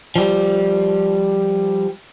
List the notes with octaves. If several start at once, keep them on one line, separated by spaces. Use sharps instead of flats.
F3 G3